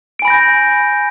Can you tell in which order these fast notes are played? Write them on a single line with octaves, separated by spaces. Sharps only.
D7 G#5 B5 A#6 G6